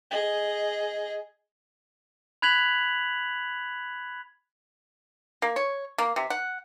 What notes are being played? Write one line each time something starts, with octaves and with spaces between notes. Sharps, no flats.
G#4 D#5
B5 F#6 G#6 B6 F7 F#7
A#3
C#5
A#3
C3
F#5